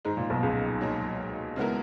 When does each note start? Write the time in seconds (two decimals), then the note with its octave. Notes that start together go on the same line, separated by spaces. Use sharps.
0.05 G#2 D#3 G#3 D#4
0.17 A#2
0.30 B1 B2
0.43 C#2 C#3
0.81 F#3 A#3 D#4
1.56 C#3 G#3 B3 E4 A#4